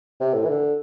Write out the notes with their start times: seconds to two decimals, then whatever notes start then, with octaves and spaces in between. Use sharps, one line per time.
0.20 C3
0.34 A2
0.45 E3
0.49 D3